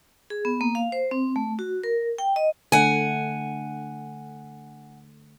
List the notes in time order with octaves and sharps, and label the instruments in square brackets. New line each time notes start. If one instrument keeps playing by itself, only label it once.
[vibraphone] G#4
B3
A#3
F5
C5
C4
A3
F#4
A#4
G5
D#5
[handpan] D3 A3 [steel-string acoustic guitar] F#5 G#5